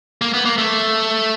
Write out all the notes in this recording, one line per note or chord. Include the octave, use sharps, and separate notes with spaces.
A#3
B3
A#3
A3